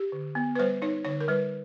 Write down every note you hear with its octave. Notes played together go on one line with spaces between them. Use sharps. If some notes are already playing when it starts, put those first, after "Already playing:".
Already playing: G4
D3
B3
B4
G3 C5
D#4 C#5
D3 C#5
A#4
G3 B4